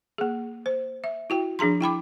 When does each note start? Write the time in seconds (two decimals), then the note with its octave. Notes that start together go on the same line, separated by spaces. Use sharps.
0.18 A#3 G#4
0.66 C5
1.04 E5
1.30 E4 F#4 G5
1.59 F3 D4 G#4 A#5 C6
1.81 E4 G5 B5 D6